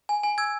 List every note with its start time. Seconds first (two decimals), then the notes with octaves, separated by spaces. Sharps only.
0.09 G#5
0.23 G#5
0.38 E6 G#6